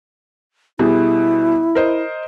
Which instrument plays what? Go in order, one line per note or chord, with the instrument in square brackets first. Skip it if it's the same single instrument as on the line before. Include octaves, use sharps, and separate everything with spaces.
[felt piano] B2 G3 G#4 [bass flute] E4
[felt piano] A#4 C5 D#5